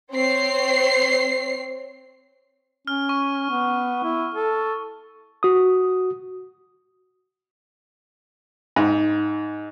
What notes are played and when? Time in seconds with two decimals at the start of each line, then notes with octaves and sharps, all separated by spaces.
0.12 C4 C#5 C7
2.87 C#4 F6
3.09 C#6
3.51 B3
4.04 E4
4.35 A4
5.43 F#4 D#6
8.76 G#2